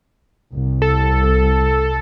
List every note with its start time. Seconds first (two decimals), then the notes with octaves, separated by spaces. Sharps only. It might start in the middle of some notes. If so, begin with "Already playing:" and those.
0.53 C2
0.82 A4